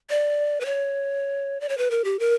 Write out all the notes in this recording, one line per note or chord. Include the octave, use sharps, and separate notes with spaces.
D5
B4
C#5
D5
C#5
B4
A#4
G4
A#4